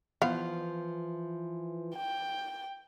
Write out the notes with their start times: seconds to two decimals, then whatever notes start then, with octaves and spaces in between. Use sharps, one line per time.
0.22 E3 F3 B3 F5
1.97 G5